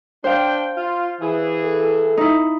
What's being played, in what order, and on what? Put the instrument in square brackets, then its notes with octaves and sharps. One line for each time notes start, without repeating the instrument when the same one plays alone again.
[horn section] D4 G5 [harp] C5 F5
[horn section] F4
E3 G#4
[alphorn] A4
[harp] D#4 E4